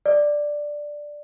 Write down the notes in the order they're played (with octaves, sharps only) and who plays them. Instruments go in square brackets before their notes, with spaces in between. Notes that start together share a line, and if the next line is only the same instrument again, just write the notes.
[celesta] D5